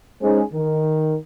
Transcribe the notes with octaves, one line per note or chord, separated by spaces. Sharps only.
G#3 C#4 D#4 G#4 C5
D#3